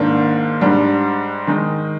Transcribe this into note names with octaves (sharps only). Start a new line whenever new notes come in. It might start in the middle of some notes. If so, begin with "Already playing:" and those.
Already playing: G#2 D#3 A#3 D4
G#2 G3 D4
D#3 G#3 D#4